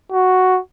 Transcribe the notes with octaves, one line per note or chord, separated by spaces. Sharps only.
F#4